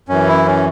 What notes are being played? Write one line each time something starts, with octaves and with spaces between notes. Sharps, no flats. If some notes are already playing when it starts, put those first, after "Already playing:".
F#2 E3 C#4
E4
C#4